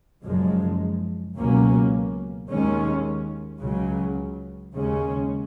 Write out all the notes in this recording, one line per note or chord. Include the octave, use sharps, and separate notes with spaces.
F#1 F#2 F3 G#3
C#2 B2 F#3 A#3 C#4
D#2 D#3 G#3 C#4
C#2 C#3 F#3
D#2 C#3 G#3 C#4